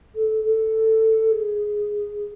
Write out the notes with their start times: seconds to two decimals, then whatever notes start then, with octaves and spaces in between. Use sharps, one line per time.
0.15 A4
0.44 A4
1.31 G#4